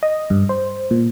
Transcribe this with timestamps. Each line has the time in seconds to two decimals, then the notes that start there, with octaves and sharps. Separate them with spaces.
0.03 D#5
0.30 G2
0.49 C5
0.91 A#2